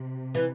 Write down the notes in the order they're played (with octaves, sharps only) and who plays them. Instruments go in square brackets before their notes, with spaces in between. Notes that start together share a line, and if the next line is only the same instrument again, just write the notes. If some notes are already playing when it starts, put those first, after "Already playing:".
Already playing: [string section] C3
[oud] E3